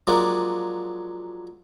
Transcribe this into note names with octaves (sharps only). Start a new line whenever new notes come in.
F3 F#3 G#3 A#3 D4